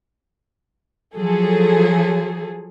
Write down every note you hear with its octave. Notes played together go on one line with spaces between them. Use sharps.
F3 F#3 G#4 A4